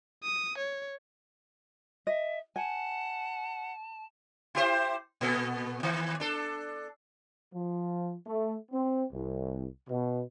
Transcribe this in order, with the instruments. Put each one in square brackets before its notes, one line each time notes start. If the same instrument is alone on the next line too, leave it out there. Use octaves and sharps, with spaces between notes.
[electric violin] D#6
C#5
[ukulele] D#5 [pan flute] E5
[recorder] F#5 [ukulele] G#5 [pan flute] A5
[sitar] E4 G4 C5
A#2 B3 A4
D#3
D4 A4
[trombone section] F3
A3
C4
C2
B2